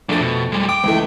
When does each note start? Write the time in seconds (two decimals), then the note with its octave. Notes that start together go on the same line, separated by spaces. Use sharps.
0.09 F2 F3 A3 D4 A6
0.21 B2
0.52 G3 G#3
0.69 G5 D6
0.84 C#2 E3 A3